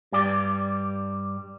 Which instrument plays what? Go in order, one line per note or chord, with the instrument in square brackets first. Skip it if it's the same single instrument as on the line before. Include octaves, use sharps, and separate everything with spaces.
[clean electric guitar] G2 G3 D5